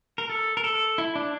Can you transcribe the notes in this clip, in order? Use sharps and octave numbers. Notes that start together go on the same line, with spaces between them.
A#4
A4
A#4
A4
E4
D4